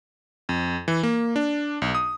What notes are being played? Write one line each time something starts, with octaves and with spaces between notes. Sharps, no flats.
F2
E3
A#3
D4
B1
D#6